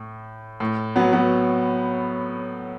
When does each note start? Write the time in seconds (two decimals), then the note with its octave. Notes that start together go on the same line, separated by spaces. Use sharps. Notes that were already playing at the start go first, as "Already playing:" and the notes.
Already playing: A2
0.60 A2
0.96 F#3 B3
1.13 F#3 B3